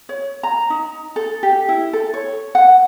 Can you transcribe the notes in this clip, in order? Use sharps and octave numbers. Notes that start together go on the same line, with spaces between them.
C#5
A#5
D#4
A4
G4
E4
A4
C#5
F#5